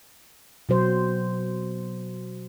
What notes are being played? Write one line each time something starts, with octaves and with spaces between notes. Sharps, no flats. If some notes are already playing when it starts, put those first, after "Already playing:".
B2 F#3 C5